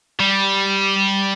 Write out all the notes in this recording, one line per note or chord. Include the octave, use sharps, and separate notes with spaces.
G3